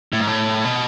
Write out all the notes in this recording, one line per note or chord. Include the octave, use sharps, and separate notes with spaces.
A2
G#2
A2
B2